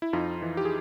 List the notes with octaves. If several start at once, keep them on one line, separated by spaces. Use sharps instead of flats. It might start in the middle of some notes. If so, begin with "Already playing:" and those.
E4
F2 D#4 F4
E3
G4
G#4